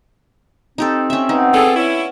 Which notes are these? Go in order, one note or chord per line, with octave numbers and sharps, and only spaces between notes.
C4 D#4 G4 A4
C#4 E5
B3 D#4 F5 F#5
F4 G#4 A4 D5
C#4 E4